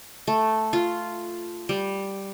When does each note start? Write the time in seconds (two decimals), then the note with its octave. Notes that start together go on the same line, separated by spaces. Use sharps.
0.27 A3
0.73 F4
1.69 G3